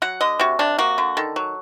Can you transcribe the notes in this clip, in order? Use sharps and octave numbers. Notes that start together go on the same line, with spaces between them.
F#3 F#5
D3 D#5
C3 F#4
C3 D4
A#3 F#4
D3
D#3 A4
F#3